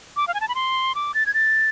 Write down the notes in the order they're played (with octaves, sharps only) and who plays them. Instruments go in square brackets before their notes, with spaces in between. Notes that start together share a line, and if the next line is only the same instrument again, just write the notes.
[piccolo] D6
F5
G#5
A5
B5
C6
D6
A6
G#6
A6